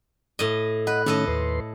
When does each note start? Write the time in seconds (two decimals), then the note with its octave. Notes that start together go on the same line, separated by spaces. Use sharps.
0.39 A2 D#5
0.87 B4 D#5 F#5
1.06 A2 D#3 A3 C#4 A4 D#5
1.28 D#2 B4 C6